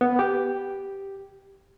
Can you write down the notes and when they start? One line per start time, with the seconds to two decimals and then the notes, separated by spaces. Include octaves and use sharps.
0.01 B3
0.19 G4